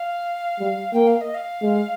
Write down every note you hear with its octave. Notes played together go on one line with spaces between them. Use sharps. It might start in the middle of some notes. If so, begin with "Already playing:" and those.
Already playing: F5
G3
A#3 G5
F5
D#5
F5
G#3